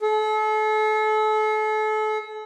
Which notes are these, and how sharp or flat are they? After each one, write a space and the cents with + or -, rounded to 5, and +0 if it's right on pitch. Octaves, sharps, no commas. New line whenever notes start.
A4 -35